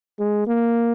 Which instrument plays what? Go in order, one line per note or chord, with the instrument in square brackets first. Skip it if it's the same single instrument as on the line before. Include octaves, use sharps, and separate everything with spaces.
[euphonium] G#3
A#3